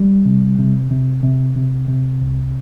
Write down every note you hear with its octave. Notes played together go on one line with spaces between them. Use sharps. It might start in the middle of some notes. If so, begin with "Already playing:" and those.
Already playing: G3
C3
C3
C3
C3
C3
C3
C2